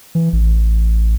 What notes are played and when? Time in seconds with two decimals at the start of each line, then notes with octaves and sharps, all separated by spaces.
0.15 E3
0.33 A1